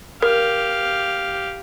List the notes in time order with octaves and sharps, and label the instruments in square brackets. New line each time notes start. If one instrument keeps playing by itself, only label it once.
[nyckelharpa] G4 F5 [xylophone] A#4